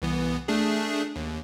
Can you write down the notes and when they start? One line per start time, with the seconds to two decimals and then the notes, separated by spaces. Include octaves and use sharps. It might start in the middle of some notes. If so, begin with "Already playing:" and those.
0.02 C2 E3 B3
0.48 A3 D4 G#4
1.16 D#2